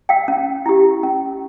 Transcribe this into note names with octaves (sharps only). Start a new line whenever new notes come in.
F5 G5
C#4
E4 G4
C#4